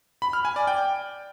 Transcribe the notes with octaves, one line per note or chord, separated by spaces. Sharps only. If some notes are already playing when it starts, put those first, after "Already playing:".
B5
F6
G#5
D5
G5